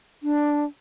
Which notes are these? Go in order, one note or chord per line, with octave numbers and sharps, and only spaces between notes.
D4